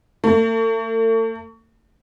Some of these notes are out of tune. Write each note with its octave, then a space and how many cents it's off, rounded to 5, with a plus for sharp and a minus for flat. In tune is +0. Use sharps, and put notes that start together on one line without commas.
A3 +40